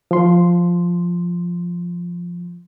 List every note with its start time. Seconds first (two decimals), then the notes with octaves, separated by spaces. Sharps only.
0.11 F3 C6